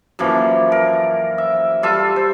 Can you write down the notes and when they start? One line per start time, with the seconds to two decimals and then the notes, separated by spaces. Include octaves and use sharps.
0.19 F#2 E3 F3 A#3
0.72 A#4
1.38 E5
1.83 G3 F4 A4 E5
2.16 C5